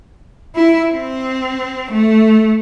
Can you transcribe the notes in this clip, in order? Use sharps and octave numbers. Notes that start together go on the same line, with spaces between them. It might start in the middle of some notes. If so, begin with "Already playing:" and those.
E4
C4
A3